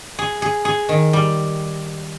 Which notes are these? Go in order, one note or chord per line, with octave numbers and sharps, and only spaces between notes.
G#4
G#4
G#4
D#3
G3